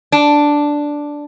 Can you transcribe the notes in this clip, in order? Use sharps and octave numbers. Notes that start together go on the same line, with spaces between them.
D4